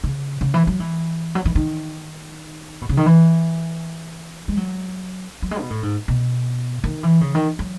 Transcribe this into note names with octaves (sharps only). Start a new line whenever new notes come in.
C#3
C#3
E3
F#3
E3
F#3
E3
D#3
B2
C#3
D#3
E3
G#3
F#3
F#3
G#3
B2
A2
G#2
B2
D#3
E3
C#3
D#3
F#3